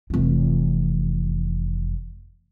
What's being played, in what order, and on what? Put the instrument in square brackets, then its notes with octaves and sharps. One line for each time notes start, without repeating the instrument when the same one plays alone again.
[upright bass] F1 E3